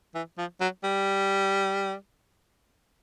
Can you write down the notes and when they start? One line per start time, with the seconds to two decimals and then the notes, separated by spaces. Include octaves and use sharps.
0.15 E3
0.38 F3
0.61 F#3
0.84 G3